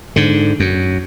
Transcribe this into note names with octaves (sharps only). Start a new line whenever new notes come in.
G#2 D3
F#2